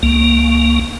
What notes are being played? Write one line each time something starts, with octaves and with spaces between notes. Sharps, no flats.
C#2 A#3